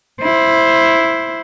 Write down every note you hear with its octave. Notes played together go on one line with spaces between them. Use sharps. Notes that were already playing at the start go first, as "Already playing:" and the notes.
E4 C5